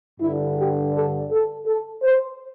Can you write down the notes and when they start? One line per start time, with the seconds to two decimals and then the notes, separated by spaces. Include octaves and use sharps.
0.21 G2 D3 E4
0.57 G4
0.93 A4
1.30 A4
1.66 A4
2.03 C5